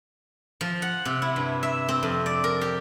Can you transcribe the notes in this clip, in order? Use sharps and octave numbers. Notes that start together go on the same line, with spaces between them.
F3
F#5
C3
E4
G2
E5
C4
F2
D5
A#4
G4